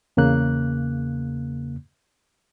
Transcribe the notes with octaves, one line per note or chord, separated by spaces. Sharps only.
E2 C#3 A#3 F#6